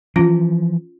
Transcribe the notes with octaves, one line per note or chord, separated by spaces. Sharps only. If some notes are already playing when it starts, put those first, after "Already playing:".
E3 F3 C#4 F4